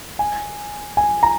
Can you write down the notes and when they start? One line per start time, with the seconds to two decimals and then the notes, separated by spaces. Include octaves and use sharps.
0.19 G#5
0.97 G#5
1.23 A#5